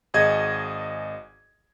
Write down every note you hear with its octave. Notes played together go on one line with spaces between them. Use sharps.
G#1 F#4 G#4 D#5 G#6